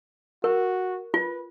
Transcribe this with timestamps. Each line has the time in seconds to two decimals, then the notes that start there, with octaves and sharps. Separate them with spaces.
0.44 F#4 A#4
1.14 F4 B4